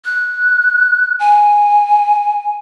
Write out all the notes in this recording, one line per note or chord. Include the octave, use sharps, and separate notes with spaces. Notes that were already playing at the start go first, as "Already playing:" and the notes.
F#6
G#5